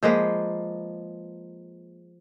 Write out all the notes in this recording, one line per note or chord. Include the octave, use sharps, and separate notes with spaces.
F3 G#3 A#3 B4